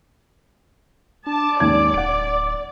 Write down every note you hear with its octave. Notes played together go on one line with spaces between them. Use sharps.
D4 A5 D6
D#2 G#2 C#4 D5 G#6
D1 F#5 D7